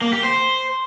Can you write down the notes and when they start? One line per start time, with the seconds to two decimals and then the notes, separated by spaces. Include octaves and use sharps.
0.01 A#3
0.12 G4
0.23 C5